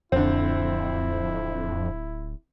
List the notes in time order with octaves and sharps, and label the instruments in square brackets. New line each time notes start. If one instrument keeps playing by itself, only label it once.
[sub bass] D1 [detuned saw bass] F2 [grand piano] D3 C4 [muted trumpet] E4